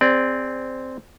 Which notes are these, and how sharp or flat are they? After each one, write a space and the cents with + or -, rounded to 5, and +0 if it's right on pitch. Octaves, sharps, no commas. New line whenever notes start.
C4 -5 G#4 -25 D5 +0